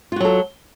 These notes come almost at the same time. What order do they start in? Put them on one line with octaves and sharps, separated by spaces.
F4 F#4 F#3 A4